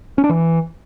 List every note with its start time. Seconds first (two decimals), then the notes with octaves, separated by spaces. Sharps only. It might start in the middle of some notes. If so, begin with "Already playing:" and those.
0.18 C#4
0.24 D4
0.29 E3